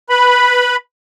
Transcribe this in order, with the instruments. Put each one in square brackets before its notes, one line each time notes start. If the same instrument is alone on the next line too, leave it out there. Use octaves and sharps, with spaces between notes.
[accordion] B4 B5